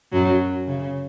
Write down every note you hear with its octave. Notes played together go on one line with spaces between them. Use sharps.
F#2 F#3
C#3